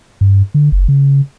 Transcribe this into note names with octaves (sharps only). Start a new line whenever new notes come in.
G2
D3
F#1
C#3